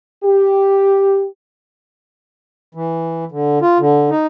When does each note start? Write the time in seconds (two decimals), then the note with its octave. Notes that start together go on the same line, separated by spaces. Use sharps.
0.24 G4
2.75 E3
3.31 D3
3.62 F4
3.79 D3
4.10 D#4